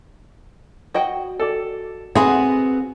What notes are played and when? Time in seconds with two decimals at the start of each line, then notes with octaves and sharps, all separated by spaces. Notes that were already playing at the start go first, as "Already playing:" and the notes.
0.94 F#4 D#5 G5
1.40 A4 D5
2.15 B3 C4 F#4 G#4 E5 F#5 B5 C6